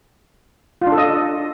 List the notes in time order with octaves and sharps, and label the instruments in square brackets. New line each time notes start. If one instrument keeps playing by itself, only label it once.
[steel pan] F4
D4
A4
D#5